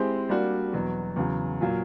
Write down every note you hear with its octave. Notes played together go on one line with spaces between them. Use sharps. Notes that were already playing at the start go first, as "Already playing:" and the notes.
Already playing: G#3 C4 E4 G4 C5
G3 A#3 D4 F#4
E2 B2 F#3
E2 C#3 F#3
A#2 F#3 A#3